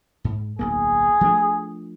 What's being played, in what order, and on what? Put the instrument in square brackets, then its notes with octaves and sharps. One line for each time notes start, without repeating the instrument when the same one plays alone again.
[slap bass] G#2
[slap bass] D1 B1 A#3 [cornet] G#4
[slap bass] F3 A3 D4